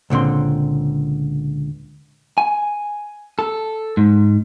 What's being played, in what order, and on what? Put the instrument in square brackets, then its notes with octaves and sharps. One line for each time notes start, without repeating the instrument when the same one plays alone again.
[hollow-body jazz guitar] C#2 A#2 D3 C4 C6
[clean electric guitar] G#5
A4
G#2